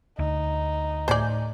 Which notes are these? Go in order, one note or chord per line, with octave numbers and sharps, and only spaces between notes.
D2 D#4
A2 C5 D5 G#5 G6